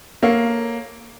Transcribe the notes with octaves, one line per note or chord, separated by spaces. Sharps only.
A#3 A4 C#5 F5